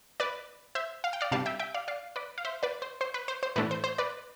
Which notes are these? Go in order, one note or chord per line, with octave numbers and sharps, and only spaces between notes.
B4 D5
C5 E5
F5
G5
D5 F5
C3 G3 D4 F5 A5
E5 G5
E5 G5
D5 F5
D5 F5
B4 D5
F5
C5 E5
B4 D5
C5
C5
B4
C5
C5
A2 E3 A3 D4 B4
C5
C5
B4 D5